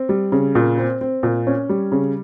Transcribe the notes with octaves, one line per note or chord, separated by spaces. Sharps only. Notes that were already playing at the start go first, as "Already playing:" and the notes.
Already playing: C4
G3
C#3
A#2
C4
C4
A#2
C#4
G3
C#3